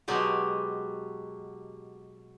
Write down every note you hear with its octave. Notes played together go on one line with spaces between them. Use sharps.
B2 F#3 G#3 G4